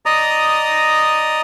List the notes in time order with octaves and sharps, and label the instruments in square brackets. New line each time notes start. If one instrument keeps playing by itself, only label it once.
[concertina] D5 D#5 A#5 D#6